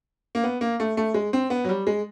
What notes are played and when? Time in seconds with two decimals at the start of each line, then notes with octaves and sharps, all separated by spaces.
0.35 A#3
0.44 B3
0.61 A#3
0.80 A3
0.97 A3
1.14 G#3
1.33 C4
1.50 B3
1.64 F#3
1.69 G3
1.87 G#3